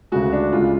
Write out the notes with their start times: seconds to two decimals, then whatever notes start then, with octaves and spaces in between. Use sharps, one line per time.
0.12 D2 C#3 G#3 F#4
0.33 D4
0.53 C#2 C#3 G#3 F4